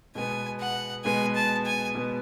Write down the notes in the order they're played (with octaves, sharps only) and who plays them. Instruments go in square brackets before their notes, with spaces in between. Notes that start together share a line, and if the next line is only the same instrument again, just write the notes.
[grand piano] B2 G#3 B3 [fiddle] G#5
[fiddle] F#5
[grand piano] B2 G#3 B3 [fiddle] G#5
[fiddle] A5
G#5
[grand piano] B2 G#3 B3